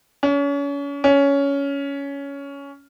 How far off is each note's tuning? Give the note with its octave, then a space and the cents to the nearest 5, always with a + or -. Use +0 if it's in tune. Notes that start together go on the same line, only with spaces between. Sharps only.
C#4 +35
C#4 +15